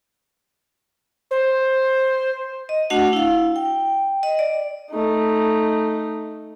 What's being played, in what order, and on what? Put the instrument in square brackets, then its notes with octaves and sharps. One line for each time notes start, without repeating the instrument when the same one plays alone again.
[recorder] C5
[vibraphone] D#5
A3 D4 F#4 F#5
E4 F5
G5
D#5
D5
[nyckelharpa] A3 D#4